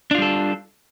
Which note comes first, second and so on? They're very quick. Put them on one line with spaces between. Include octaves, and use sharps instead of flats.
D4 F4 G3 A4